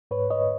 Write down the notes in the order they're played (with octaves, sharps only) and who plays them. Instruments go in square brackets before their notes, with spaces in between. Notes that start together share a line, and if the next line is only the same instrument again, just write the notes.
[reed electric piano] G#2 B4 C#5
G#2 C#5 D#5